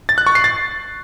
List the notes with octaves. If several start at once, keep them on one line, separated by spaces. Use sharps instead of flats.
A6
F#6
C#6
C7
A6